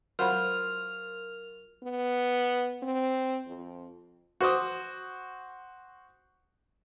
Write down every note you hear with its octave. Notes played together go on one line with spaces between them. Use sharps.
F#3 F4 A#4 C5 F#5 B5 F6 F7
B3
C4
F2
F#4 C5 D6 D#6